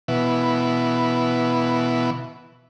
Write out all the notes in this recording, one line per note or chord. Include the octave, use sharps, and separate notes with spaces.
B2 E3